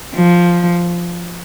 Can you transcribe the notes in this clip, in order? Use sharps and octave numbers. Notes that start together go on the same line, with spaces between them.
F3